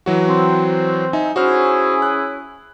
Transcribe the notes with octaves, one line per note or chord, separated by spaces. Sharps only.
E3 F#3 F#4
C4
D#4 E5 G#5
C#4 E4 F#4 G#4 C5 F6
F#6